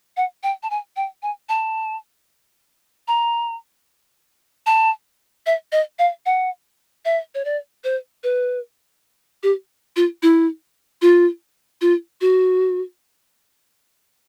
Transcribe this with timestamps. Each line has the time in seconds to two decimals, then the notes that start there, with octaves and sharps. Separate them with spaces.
0.17 F#5
0.43 G5
0.63 A5
0.70 G#5
0.96 G5
1.23 G#5
1.49 A5
3.08 A#5
4.66 A5
5.46 E5
5.72 D#5
5.99 F5
6.26 F#5
7.05 E5
7.35 C#5
7.45 D5
7.84 C5
8.23 B4
9.43 G4
9.96 F4
10.23 E4
11.02 F4
11.81 F4
12.21 F#4